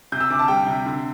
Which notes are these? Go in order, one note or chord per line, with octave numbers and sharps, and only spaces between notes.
C3 G6
E6
D2 D6
A5
G3 G5
C3
D3